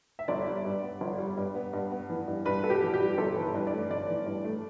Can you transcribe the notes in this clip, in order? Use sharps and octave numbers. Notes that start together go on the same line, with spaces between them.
E5
G1 D5
G3
G2
B3
G1
G3
G2
B3
G2
B3
E3
G2
G2 B4
B3 A4
G4
E3
G4
G2
G1 A4
E3
B4
G2
D5
A3
G1 D5
E3
G2
A3